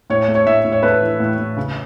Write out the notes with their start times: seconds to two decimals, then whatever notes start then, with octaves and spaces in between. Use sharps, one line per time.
0.10 A2 C#5
0.28 A3
0.35 C#5
0.46 A2 E5
0.65 A2
0.72 C#5
0.83 A3 B4
1.01 E3
1.20 A2
1.38 A2
1.57 C#3